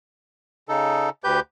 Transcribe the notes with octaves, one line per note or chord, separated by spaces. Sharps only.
C#3 D#4 A4
D2 G4 B4 G6